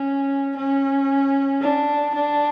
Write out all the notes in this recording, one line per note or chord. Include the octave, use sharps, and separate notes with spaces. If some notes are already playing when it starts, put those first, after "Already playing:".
Already playing: C#4
C#4
D4
D4